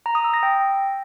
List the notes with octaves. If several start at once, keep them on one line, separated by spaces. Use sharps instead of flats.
A#5
D#6
E6
A#6
G5